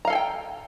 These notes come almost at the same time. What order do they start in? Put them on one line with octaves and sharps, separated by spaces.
A#5 F5 A4 G#5 G5